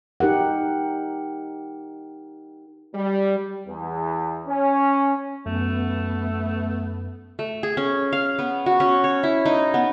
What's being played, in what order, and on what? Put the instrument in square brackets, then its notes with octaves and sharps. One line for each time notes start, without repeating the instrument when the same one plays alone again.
[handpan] D#4 G4 A#4 F#5
[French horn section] G3
[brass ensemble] E2
C#4
[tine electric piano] F#2 [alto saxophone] A3 [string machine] B3
[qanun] A3
G#4
C#4
F5
B3
F#4
C#4
C#5
E4
D#4
B3